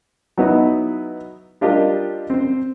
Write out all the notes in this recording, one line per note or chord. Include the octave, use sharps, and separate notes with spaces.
F#3 B3 D#4 E4
G3 D4 F4 G4 A#4 D#5
C4 C5